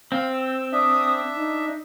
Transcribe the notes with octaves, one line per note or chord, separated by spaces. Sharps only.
C4 F5
E6
D4 E5 D#6
D#4